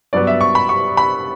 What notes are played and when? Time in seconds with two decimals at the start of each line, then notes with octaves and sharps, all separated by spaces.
0.13 G2 F#3 B3 D5
0.27 E5
0.41 C#6
0.55 B5
0.69 C#6
0.97 B5